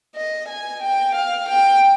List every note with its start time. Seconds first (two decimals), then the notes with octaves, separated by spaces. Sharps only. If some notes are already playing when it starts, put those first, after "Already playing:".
0.16 D#5
0.48 G#5
0.82 G5
1.15 F5
1.49 G5